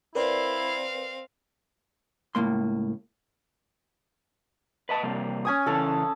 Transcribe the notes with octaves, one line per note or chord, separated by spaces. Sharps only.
C4 E4 A#4 B4 D5 F5
C#2 F#2 A2 A#3 C6
B4 D#5 A5
C3 G3 A#3
C#4 G#5 D#6
C#3 E3 C#4 A4 A5